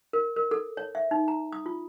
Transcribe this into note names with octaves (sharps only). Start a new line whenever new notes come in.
A#4
A#4
A4
C#5
E5
D#4
A#5
D#6
F4